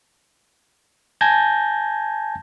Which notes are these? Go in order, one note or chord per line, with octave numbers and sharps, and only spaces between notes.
G#5 A5 G6 G#6 A#6